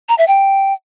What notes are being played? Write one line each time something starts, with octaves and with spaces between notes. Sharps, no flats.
A#5
E5
G5